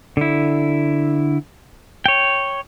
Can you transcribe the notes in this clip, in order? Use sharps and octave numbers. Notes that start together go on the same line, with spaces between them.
D3 E4
C#5 G5